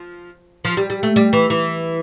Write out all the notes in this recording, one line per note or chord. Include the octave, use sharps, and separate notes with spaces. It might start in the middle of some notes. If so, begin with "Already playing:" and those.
Already playing: F3
F3
G3
G3
A3
G3
E3
E3